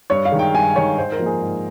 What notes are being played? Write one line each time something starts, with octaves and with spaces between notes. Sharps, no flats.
G2 C#5
F5
D#3 G#3
G5
G2 G#5
D#3 G#3 C#5
G#2 C5
A#4
F3 A#3
G#4
G#2